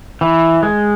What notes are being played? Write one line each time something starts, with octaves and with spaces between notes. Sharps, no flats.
E3
G#3